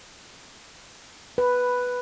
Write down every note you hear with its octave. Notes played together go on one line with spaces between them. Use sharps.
B4